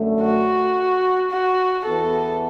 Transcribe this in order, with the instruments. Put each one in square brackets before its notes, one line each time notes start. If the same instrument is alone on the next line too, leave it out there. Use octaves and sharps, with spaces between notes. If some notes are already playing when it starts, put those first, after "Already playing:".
Already playing: [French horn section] F#2 D3 A3
[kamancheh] F#4
F#4
[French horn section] E2 E3 B3 E4 [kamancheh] A4